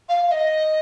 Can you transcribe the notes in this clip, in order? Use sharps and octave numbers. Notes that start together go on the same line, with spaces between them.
F5
F5
D#5